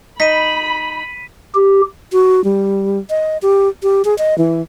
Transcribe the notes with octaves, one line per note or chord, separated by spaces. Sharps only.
D#4 B5 B6 D#7
G4
F#4
G3
D#5
G4
G4
G#4
D#5
E3